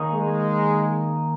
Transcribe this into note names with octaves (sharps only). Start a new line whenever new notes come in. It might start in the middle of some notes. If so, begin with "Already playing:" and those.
Already playing: D#3 A#3 D#4 G#4 C#5
G#3